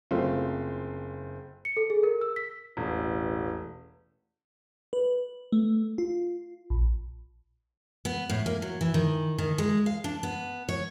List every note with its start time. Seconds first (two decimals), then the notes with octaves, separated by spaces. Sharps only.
0.11 F#1 A3 C4 F4 C5
1.65 C#7
1.77 A4
1.90 G#4
2.03 A#4
2.21 E6
2.36 B6
2.77 E1 A1
4.93 B4
5.52 A3
5.98 F4
6.70 A#1
8.05 B3
8.30 A2
8.46 A#3
8.62 F#3
8.81 E3
8.94 D#3
9.38 D#3
9.58 G#3
9.86 F5
10.04 D4
10.23 B3
10.69 C#5